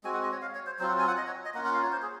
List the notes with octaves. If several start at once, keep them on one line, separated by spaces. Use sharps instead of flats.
G#3 C4 F#4 G#5
F#5
D#5
C#5
F5
C#5
C5
F#3 C4 F4 C5
F#5
G#5
F#5
D#5
C#5
D#5
A#3 C#4 F4 F#5
F#5
F5
C#5
C5
G#4